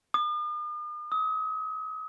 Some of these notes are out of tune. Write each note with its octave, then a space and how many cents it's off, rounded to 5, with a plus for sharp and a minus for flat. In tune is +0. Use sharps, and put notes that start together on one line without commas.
D#6 -45
D#6 +40